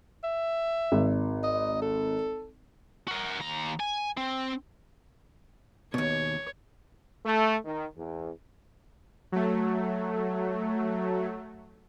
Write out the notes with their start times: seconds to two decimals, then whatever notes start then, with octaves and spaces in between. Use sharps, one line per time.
0.24 E5
0.92 G#1
1.44 D#5
1.82 A4
3.08 F#4 A#4
3.39 D#2 A#5
3.80 G#5
4.17 C4
5.94 D#2 B2 C#5
7.25 A3
7.65 D#3
7.96 E2
9.32 F#3 A3